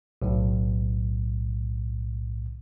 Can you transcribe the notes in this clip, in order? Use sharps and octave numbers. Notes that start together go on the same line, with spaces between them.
B1 A2